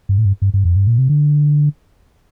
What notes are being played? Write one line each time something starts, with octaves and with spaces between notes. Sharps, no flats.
G2
A2
G2
G2
G2
F2
G2
A#2
C3
D3